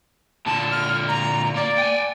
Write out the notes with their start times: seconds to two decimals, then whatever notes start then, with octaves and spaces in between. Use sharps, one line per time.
0.46 A#2 D3 A5
0.71 F6
1.08 A#5
1.55 A#3 D5
1.78 G5 G#5